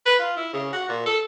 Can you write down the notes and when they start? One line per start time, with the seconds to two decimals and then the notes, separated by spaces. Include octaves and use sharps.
0.06 B4
0.19 F4
0.36 E4
0.53 C#3
0.73 F#4
0.88 A#2
1.06 A4